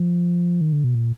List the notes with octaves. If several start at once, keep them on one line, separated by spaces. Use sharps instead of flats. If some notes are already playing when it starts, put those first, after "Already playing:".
Already playing: F3
D#3
D3
B2
A#2